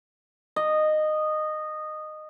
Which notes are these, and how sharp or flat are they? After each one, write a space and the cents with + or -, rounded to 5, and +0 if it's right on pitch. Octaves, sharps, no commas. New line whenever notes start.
D#5 -15